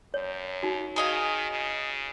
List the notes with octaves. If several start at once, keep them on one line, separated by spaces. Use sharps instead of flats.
F#2 C#5
D#4 F#4
D#3 G#4 D#5 F5
C#3